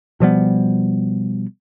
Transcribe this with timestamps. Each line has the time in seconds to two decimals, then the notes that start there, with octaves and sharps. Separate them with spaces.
0.20 B2 F3 G3 B3